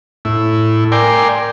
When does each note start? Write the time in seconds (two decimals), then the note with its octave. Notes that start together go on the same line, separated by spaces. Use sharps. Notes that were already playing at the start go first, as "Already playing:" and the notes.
0.25 A2 E4
0.92 A#4 D5 G5 G#5 C6